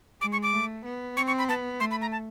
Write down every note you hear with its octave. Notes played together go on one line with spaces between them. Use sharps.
G#3 D6
C#6
D6
A3
B3
C4 C#6
C#6
B5
B3 A5
A3 C6
B5
A#5
A5